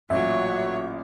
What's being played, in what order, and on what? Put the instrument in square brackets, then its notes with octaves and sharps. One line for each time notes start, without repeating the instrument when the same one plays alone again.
[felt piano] A1 A#2 [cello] F#3 C#5 [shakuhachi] F#4 [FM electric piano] E5